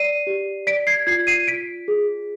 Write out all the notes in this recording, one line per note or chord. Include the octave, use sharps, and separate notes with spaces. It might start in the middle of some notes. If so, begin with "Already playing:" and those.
Already playing: D5 C7 D#7
G4
D5 B6 D7
G#6 C7
F4 G#6 C7
C7 D#7
F4 B6 D7
G#4